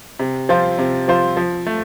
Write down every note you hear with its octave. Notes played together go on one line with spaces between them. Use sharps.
C3
F3 C4 F4 C5
C3
F3 C4 F4 C5
F3
A3